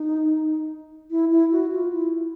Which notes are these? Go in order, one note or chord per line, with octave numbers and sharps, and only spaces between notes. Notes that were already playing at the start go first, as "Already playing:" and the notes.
Already playing: D#4
E4
E4
F#4
F4
E4